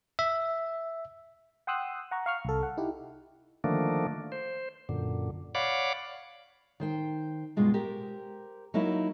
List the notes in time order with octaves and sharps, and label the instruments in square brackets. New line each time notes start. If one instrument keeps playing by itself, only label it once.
[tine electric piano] E5
[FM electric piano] F#5 G5 C6 D#6 E6 F#6
F#5 A#5 C#6
F5 C#6 F6
C2 A4
F#5
D#4 E4 G4
[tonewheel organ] D3 D#3 F3 A3 A#3 D4
C5
F#2 A#2 D3
C#5 D5 F5 F#5 B5 D6
[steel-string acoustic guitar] D#3 C5 G5
G2 B2 G#3 F4
G4 A#4 C5
F#3 A#3 D#4 E4